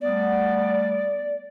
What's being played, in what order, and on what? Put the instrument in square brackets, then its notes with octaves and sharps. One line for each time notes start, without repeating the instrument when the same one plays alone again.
[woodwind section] G3 A3 B3 [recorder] D5